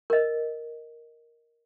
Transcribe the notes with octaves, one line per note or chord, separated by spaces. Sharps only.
A#4 D#5